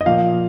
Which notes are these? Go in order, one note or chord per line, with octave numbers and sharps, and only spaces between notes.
D#5
A#2 F3 A#3 F5